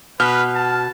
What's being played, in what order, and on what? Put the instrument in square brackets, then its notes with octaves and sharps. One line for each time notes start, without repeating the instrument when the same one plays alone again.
[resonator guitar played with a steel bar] B2 [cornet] B4 [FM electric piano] F6
[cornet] A5